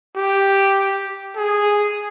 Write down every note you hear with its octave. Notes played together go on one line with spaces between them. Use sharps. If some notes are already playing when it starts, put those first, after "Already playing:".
G4
G#4